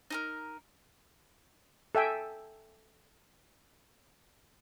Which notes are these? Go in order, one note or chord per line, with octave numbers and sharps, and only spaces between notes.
D#4 A4 A#4
A4 E5 G5 G#5